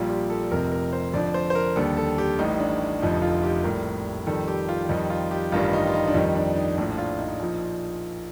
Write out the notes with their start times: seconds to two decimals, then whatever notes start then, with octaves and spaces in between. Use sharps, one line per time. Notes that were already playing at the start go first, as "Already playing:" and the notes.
Already playing: A#1 A#2 G3 F4
0.09 G4
0.30 A4
0.51 F1 F2 C3 A#4
0.72 A#4
0.93 C5
1.14 F2 D3 F3 D5
1.34 C5
1.50 C5
1.55 A#4
1.76 D#2 D3 G3 A4
1.97 A4
2.18 G4
2.39 A1 A2 G3 D#4
2.60 D4
3.01 F1 F2 D3 F3 D#4
3.22 F4
3.43 G4
3.64 A#1 A2 G3 A#4
4.27 F2 D#3 G3 A4
4.48 G4
4.69 F4
4.89 F2 D#3 G3 D#4
5.10 F4
5.31 G4
5.52 A1 G2 D#3 G3 F4
5.73 D#4
5.87 F4
5.94 D#4
6.07 D4
6.14 F2 D#3 G3 D#4
6.35 D4
6.56 D#4
6.77 A#1 A2 F3 D4
6.98 F4
7.19 D#4
7.40 A#1 A#2 F3